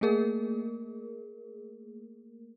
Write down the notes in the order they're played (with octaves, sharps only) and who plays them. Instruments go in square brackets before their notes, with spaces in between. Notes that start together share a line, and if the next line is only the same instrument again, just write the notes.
[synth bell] A3 A#3 G#4 A#4